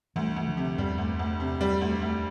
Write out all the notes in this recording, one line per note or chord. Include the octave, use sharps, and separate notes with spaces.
D2 E3 G3
D2
D3 F3
C3
E2 G2 G3
D2
D2
C3
G3
D2
D2